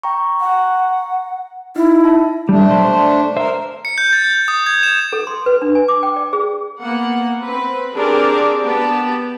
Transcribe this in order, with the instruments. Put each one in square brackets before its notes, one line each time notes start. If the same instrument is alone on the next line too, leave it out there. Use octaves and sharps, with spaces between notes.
[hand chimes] G5 A#5 C#6
[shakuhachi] F#5
[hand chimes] D#4 [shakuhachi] E4
[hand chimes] E5 A5
[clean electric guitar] G3 [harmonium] A3 D4
[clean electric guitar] B1 C5
C5
[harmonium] A#4 [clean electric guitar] C5 E5
[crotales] C#7
G6
A6
G6
D#6
G#6
E7
[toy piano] A4
C6
B4
D4
G#5
D6
G5
D5
G#4
[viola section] A#3 B3 F#5
C4 B4
C4 D4 G4 G#4 A#4 D5
B3 G4 A5